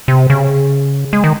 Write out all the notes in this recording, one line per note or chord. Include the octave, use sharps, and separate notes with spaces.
C3
C#3
G#3
D#3